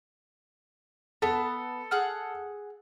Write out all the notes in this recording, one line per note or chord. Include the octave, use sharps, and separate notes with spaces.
B3 A4 A5
G#4 F#5 F6